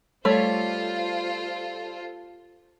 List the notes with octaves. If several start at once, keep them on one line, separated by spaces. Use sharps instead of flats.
G3 A3 F4 A4 C5 C#5